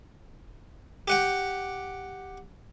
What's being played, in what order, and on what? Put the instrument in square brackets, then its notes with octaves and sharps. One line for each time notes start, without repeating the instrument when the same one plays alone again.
[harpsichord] G4 F#5 G5